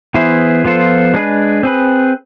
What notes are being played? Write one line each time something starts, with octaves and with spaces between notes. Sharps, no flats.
E3 B3 E4 G#4 C5
F3 B3 F4 A4 C5
G#3 D4 G#4 B4
C4 G#4 B4